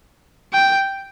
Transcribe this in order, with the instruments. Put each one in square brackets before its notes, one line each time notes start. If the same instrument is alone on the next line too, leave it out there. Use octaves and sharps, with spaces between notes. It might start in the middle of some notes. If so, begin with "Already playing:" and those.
[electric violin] G5